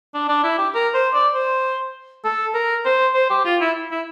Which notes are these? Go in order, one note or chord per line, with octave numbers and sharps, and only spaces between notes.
D4
D4
E4
G4
A#4
C5
D5
C5
A4
A#4
C5
C5
G4
F4
E4
E4